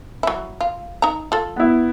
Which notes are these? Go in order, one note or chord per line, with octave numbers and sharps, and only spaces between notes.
F#3 E4
F4
D#4 A#5
F4 A4
B3 E4